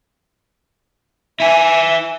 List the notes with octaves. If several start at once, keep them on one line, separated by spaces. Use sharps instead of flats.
E4 E5 G#5